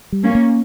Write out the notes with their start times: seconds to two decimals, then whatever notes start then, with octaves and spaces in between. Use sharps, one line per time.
0.12 G3
0.24 A#3 C#4
0.35 A#3